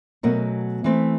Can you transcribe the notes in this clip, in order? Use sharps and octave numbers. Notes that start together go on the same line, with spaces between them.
B2 F#3 A3 C#4 A#4
E3 A3 C4